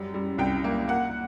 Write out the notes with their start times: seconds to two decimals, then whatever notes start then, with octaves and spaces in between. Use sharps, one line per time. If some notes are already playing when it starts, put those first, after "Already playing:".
Already playing: F#2 G3
0.14 G3
0.38 C2 G5
0.64 A#3
0.88 A#3 F#5